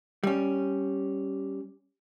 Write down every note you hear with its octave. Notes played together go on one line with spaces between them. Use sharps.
G3 C#4